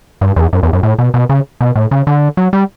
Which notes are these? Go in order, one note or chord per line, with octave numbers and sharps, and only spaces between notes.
G2
E2
F#2
E2
F#2
A2
B2
B2
C#3
B2
A2
C#3
D3
F#3
G3